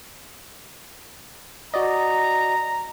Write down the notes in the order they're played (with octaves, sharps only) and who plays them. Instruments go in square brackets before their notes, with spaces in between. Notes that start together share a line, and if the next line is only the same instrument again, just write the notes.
[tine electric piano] F#4 D5 D#5 [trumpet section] A#5